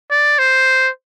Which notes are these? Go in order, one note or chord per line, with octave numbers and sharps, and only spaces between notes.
D5
C5